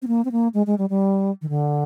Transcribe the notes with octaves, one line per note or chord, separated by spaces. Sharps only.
C4
A#3
C4
A#3
G#3
G#3
G3
G3
D#3
D3